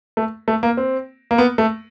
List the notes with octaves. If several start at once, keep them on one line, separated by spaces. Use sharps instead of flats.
A3
A3
A#3
C4
A#3
B3
A3